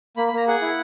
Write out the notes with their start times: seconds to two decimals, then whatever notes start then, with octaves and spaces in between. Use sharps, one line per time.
0.17 A#3 B5
0.28 B5
0.33 A#3 A#5
0.48 G#4 F#5
0.62 E4